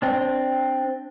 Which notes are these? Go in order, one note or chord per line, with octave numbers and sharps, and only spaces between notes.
C4 D4